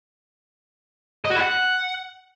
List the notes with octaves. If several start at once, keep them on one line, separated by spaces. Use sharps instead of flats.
D#5
F#4
E4
F#5